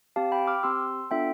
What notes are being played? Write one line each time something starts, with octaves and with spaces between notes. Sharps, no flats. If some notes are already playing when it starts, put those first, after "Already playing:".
C4 G4 F5 A5
G5 B5
D6 F6
C4 G4 C6 E6
B3 D4 F4 A4 E5 G5